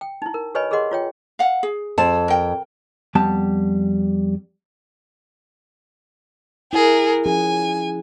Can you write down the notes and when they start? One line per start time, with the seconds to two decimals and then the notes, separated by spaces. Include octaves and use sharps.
0.01 G5
0.22 D#4 E4
0.34 A#4
0.55 G4 B4 C#5 D#5 G#5 B5
0.71 G4 G#4 A#4 D#5 F#5 C6
0.91 F4 C#5 G5
1.39 F5 F#5
1.63 G#4
1.98 F2 A5
2.28 A#4 G5
3.15 F2 G3 B3 G5 A5
6.73 E4 G#4 A#4 F#5
7.26 F3 C#4 G#4 G#5